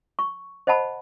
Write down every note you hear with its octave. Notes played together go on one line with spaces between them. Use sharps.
C#6
C5 D#5 F#5 A5 B5